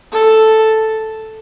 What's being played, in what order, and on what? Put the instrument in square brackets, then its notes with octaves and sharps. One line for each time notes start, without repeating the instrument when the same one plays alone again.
[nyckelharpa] A4